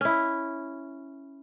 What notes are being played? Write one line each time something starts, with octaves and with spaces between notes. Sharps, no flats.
C#4 E4